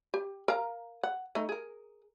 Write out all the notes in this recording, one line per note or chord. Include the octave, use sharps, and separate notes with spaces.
G4
A#4 F5 A#5
F#5
A3 D#4
G#4 A#4